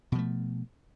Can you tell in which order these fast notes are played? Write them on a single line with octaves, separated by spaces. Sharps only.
B2 F3 A3